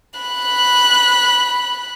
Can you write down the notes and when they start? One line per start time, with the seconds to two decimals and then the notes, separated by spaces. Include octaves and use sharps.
0.20 B5 F#6